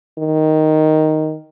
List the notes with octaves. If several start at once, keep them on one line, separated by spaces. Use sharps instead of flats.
D#3